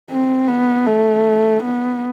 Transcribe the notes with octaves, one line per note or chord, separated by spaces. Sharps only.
C4
B3
A3
B3